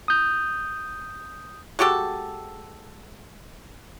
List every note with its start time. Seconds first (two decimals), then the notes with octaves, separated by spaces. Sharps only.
0.08 D#6 G6
1.79 G#3 F#4 G4 A4